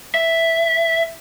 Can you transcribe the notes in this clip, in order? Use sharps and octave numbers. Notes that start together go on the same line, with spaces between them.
E5